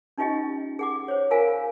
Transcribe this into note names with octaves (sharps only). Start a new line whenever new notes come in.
C#4 D#4 F4 G4 D#5 G5
G#4 F#5 D6
C5 C#5
F4 A#4 F5 G#5